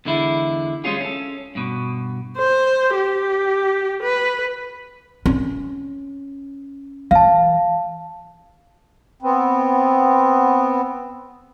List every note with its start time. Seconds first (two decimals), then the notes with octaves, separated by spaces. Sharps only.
0.05 E2 D3 G#3 E4
0.84 G3 G#3 C4 C#4 F4 G#4
1.01 C#4 A4
1.55 G2 B2
2.38 C5
2.95 G4
4.02 B4
5.26 C#4
7.11 E3 F5 A5
9.22 B3 C4